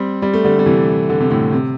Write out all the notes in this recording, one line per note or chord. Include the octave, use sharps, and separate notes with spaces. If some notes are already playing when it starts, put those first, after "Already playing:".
Already playing: G3 C4
G3
A3
D3 G3
G3
C3 E3
D3
C3
A2 D3
C3